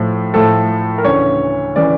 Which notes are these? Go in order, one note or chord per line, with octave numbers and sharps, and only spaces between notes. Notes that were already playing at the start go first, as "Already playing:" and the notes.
Already playing: A2 F3 A3
A2 F3 A3 A4
A#4
D2 C#3 E3 C#5
C#3 E3 D5